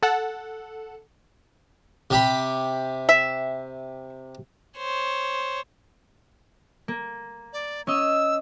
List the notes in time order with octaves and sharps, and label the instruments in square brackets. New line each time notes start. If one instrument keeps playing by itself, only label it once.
[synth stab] A4 F#5
[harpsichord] C3 G4 B5
[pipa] E5
[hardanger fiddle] C5 C#5
[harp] A#3
[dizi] D5
[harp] C#4 D#5 [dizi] E6